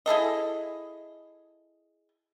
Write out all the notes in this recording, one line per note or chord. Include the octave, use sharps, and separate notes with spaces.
E4 G#4 A4 D#5